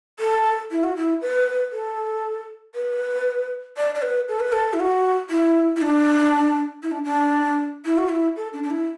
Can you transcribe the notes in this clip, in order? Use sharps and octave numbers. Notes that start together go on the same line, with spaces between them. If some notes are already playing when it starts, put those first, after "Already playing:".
A4
E4
F#4
E4
B4
A4
B4
D5
D5
B4
A4
B4
A4
E4
F#4
E4
E4
D4
E4
D4
D4
E4
F#4
E4
A4
D4
D4
E4